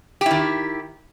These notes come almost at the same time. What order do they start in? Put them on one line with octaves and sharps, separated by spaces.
G4 E4 D#3